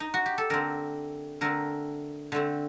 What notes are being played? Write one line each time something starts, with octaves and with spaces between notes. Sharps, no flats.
D#4
F#4
G4
A4
D3 A3 C4 A#4
D3 A3 C4 A#4
D3 A3 C4